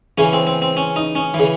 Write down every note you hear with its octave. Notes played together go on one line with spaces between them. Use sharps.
C#3 E3 C#4
C4
C4
C4
C#4
D#4
C#4
C#3 E3